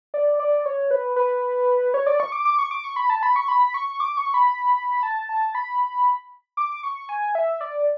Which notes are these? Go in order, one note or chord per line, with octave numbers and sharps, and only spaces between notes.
D5
D5
C#5
B4
B4
C#5
D5
C#6
D6
D6
C#6
D6
C#6
B5
A5
B5
C#6
B5
C#6
D6
C#6
B5
A5
A5
B5
D6
C#6
G#5
E5
D5